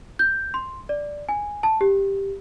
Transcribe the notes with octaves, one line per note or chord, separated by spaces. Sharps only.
G6
C6
D5
G#5
A5
G4